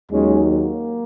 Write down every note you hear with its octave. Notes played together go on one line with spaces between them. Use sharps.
D#2 D#3 F#3 G#3 C#4
A#3